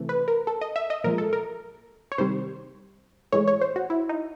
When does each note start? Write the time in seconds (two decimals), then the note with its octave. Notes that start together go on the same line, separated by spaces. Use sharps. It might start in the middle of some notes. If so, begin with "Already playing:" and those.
Already playing: C3 E3 A3
0.09 B4
0.28 A#4
0.47 A4
0.61 D#5
0.76 E5
0.90 D#5
1.04 A#2 F3 G#3 A#4
1.18 A4
1.33 A#4
2.12 C#5
2.18 C3 D#3 G3 C5
3.32 A2 E3 G#3 C#5
3.48 C#5
3.61 C5
3.76 F#4
3.90 E4
4.09 D#4